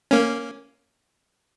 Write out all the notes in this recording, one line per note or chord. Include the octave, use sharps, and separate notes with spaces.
A#3 C#4